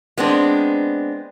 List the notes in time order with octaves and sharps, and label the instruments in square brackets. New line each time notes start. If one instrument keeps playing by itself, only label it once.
[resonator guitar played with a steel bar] G#3 B3 C4 D4